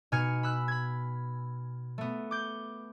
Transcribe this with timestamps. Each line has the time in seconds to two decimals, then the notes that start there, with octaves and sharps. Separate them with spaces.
0.12 B2 D#4 G#5 F6 G#6 C#7
0.43 B5 E6 F#6
0.68 B5 G#6
1.98 A3 B3
2.31 D6 G6